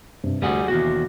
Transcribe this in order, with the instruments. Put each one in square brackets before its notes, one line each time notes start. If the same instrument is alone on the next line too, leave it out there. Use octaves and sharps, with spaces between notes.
[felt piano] G2 C3
[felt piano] D2 [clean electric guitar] G3 G#4 F#5
[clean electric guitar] D#2 F#4 [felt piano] B2 E3